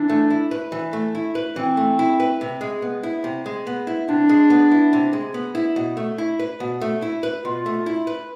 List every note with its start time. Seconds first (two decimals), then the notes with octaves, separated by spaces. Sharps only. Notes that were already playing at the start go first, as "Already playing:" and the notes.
Already playing: E3 D4
0.10 A3
0.30 E4
0.51 B4
0.72 E3
0.93 A3
1.15 E4
1.35 B4
1.56 E3 C4
1.77 A3
1.99 E4
2.20 B4
2.41 C3
2.61 G#3
2.82 B3
3.03 E4
3.24 C3
3.46 G#3
3.67 B3
3.87 E4
4.09 C3 D4
4.29 G#3
4.50 B3
4.71 E4
4.93 C3
5.13 G#3
5.34 B3
5.55 E4
5.76 B2
5.97 A3
6.18 E4
6.39 B4
6.60 B2
6.81 A3
7.02 E4
7.23 B4
7.45 B2 F4
7.66 A3
7.86 E4
8.07 B4